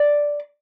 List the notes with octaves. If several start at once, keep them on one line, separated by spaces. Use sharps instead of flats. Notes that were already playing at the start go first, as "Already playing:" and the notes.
Already playing: D5